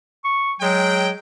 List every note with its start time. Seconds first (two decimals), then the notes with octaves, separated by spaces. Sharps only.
0.25 C#6
0.60 F#3 G#3 G5